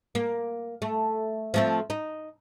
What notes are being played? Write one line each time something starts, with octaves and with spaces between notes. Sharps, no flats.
A#3
A3
F3 A3 C4
D#4